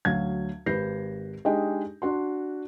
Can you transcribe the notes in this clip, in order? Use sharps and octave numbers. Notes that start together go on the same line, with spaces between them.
D2 F#3 F5 G#6
G#1 G4 B4 G6 A#6 C7
G#3 D4 D#4 G4 D#5 G5
D4 F#4 C6